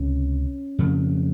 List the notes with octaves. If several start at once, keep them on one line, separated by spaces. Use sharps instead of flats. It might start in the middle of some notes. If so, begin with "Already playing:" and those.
Already playing: C#2 C3 C#4
F2 C#3